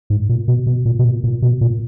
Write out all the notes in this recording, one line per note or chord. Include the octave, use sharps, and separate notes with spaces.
G#2
A#2
B2
B2
A#2
B2
A#2
A#2
B2
A#2